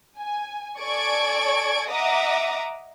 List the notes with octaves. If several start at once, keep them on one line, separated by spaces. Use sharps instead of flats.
G#5
A4 D5 G#5 C#6 G#6 D7
D#5 E5 F#5 A#5 D6 D#6